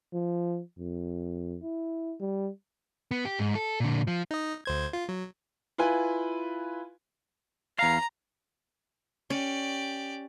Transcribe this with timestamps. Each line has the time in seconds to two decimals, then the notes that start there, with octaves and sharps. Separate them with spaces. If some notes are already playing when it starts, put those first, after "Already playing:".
0.13 F3
0.79 F2
1.62 E4
2.20 G3
3.11 B3
3.25 G4
3.39 G#2
3.55 A4
3.80 A#2 D3
4.07 F3
4.31 D#4 D#5
4.65 D2 C5 G#6
4.93 F4
5.09 F#3
5.78 E4 F4 B4 G#5
7.79 E2 F5 A#5
9.30 C#4 G4 D5